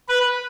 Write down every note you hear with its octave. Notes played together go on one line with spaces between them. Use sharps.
B4